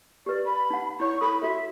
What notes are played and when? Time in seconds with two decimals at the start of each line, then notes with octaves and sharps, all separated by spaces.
0.26 G4 B4 D5
0.45 B5
0.70 D#4 F#5
1.00 E4 C#5 C#6
1.21 A4 B5 D#6
1.42 F#4 A4 E5